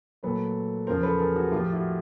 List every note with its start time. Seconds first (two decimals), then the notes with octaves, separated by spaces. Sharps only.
0.23 A#2 F#3 A3 A4 B4
0.87 E2 C#3 F3 A#4 C5
1.03 A4 B4
1.19 G#4 A#4
1.36 F#4 G#4
1.52 A2 F3 A3 F4 G4
1.73 E4 F#4